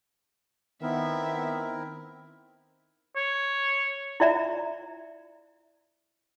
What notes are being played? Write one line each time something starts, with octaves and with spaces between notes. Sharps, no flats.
D#3 B3 C4 E4 A#4 E5
C#5
E4 F4 D5 E5 A#5